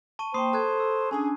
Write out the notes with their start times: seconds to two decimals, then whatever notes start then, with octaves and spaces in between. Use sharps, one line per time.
0.19 A5 C#6 D#7
0.34 A#3 C5 G5 B5 D#6 C7
0.53 A4 A5 F#6 G#6
0.80 E6
1.11 C#4 D4 G#4 G#5